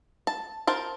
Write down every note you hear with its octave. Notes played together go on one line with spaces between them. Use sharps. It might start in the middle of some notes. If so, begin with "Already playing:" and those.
A5
A#4 C5 A5